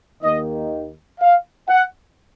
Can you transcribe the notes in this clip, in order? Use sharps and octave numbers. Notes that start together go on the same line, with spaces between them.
D#2 D#3 A#3 D#4 D#5
F5
F#5